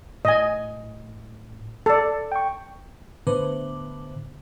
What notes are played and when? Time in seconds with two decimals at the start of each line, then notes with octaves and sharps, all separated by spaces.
0.25 A2 D#5 G#5
1.86 A4 D5
2.32 G5 C#6
3.27 A2 D3 B3 B4 C5 D6